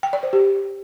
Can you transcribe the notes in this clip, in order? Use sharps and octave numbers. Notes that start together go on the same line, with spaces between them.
G5
D5
C5
G4